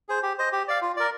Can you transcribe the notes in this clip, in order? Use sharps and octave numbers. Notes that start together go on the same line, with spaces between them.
G#4 C5
G4
C5 D#5
G4
D5 F5
F4
A#4 D5